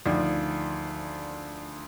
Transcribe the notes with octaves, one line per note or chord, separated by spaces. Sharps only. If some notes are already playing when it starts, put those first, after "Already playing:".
D2 D#3 F3 D5